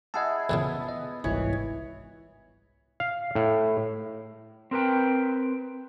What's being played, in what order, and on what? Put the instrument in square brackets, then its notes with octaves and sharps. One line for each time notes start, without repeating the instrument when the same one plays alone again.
[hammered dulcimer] E4 G#4 [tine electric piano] D#5 F#5 A5
[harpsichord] E2 A#2 C#3 [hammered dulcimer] B3
[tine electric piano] D#5
[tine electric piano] G1 C2 G#2 [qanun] E3 [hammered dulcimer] C#5
[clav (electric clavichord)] F5
A2
[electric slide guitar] C4 A#4 B4 G5